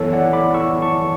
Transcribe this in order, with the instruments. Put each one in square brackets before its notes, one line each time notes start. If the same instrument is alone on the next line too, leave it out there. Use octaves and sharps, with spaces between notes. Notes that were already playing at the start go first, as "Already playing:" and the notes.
Already playing: [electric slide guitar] F#2 E3 B3 [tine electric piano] A4 C#5
[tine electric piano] D5 F#5
B5 D6
C#6 E6
A5 C#6